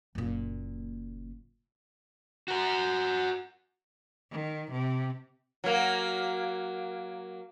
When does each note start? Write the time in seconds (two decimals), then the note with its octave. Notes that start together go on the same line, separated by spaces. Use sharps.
0.15 F#1 A#2
2.48 F#4 A#4
4.32 D#3
4.72 C3
5.64 F#3 A#3